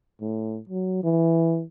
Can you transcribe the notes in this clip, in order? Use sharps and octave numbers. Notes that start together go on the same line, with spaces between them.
A2
F#3
E3